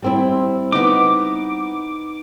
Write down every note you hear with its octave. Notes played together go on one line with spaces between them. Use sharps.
G3 C4 E4
B3 D#4 D6